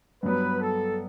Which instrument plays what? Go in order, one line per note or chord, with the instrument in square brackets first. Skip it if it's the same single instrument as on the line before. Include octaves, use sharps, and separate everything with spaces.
[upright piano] G2 F#3 B3 [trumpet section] B4
[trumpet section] A4